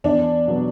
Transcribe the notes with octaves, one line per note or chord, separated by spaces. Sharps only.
E2 D4
B2 F#3 B3 F#4